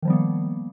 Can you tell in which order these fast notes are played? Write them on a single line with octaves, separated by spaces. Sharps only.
D#3 F3 G3 B3 A#3